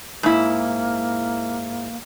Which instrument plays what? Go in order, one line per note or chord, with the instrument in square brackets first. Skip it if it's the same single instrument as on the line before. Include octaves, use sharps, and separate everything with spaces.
[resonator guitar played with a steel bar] G#2 E4 [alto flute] A#3